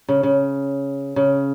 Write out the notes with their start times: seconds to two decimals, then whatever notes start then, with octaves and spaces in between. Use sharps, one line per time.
0.08 C#3
0.23 C#3
1.16 C#3